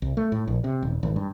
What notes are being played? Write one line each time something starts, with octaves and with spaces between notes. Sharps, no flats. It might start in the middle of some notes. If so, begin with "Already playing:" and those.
C2
A3
A2
A#1
C3
D#1
G#1
G2